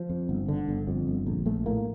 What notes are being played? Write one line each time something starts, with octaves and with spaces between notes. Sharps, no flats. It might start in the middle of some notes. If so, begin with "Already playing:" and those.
Already playing: F3
F2
G1
D3
G1
F2
G1
A#1
A#1 A3
A2 A#3